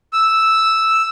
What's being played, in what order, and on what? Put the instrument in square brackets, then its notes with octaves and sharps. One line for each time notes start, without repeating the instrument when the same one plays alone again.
[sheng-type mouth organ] E6